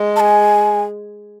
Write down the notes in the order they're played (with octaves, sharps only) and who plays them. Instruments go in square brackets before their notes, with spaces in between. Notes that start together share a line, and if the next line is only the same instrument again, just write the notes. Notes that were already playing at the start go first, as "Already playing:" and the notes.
Already playing: [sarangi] G#3
[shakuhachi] A5
G#5